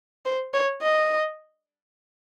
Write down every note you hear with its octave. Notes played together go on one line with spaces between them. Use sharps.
C5
C#5
D#5